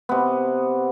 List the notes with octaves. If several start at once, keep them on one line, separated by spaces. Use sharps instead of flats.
C3 B3